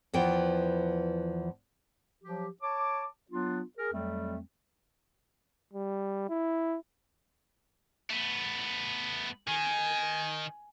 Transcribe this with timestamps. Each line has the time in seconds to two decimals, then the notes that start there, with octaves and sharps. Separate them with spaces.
0.13 E2 E3 F3 B3 G5
2.24 F3 F#3 G4
2.62 C#5 A5 D6
3.31 F#3 B3 D4 F4
3.78 G#4 A#4
3.93 F2 F#3 G3 A3 C4
5.73 G3
6.29 E4
8.10 A3 B3
9.48 D#3 G#5